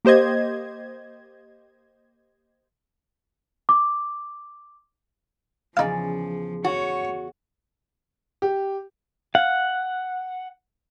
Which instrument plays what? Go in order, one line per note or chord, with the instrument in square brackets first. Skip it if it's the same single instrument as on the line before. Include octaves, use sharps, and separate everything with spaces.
[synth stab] A#3 G4 C5 D#5 G#6
[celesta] D6
[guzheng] E2 C#3 D5 [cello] F3 [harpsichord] D#4 F5
[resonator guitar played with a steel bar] F#4 [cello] C#5
[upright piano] G4
[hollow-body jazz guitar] F5 [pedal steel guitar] F#5